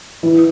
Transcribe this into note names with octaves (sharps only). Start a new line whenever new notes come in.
E3 E4